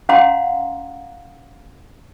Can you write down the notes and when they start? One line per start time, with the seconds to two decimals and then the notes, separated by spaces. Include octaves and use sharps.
0.09 C#4 F5 F#5 A#5 C6